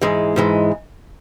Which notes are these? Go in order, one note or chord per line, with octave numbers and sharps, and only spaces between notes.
G#2 E3 G#3
G#2 E3 G#3